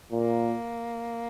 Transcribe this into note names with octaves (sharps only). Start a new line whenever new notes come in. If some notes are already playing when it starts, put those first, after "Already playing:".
A#2 A#3